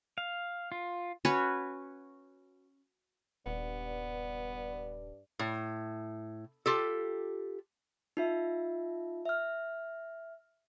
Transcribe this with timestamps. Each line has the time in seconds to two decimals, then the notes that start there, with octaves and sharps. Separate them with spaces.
0.18 F5
0.72 F4
1.25 C#4 F#4 B4 C#5
3.46 D#1 G2 B3 D5
5.39 A2
6.66 F4 G4 A4
8.17 D#4 F4 E5
9.25 E5 F6